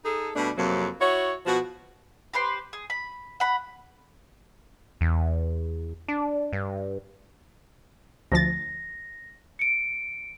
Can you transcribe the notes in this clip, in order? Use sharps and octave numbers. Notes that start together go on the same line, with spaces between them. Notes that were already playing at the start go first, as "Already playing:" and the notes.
D#4 G#4 A4
B2 G3 A3 D4
F2 C3 F#3 A#3
E4 F#4 C#5
B2 F3 F#4
G4 B4 C5 C6
G#4
B5
F#5 B5
E2
D4
G2
D2 F3 A6 A#6
C#7 D7